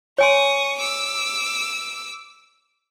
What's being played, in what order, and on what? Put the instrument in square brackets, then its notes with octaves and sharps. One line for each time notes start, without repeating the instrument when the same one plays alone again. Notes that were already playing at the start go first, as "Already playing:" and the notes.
[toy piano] C#5 G#5 C6 [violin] C#6 D#6
[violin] D6 E6